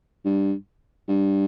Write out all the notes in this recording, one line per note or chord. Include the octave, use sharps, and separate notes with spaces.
G2
G2